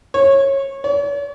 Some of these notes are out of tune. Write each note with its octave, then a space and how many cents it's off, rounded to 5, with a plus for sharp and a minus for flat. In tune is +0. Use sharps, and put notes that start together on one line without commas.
C#5 -20
C#5 +45